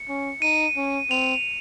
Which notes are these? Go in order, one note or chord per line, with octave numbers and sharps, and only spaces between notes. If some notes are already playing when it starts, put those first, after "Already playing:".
Already playing: C#7
C#4
D#4 D#7
C#4
C4 F7